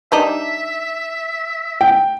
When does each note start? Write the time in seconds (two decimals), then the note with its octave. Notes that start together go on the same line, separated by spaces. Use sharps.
0.12 G3 D4 D#4 E5
1.81 G5